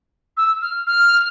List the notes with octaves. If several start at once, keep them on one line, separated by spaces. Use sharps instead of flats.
E6
F6
F6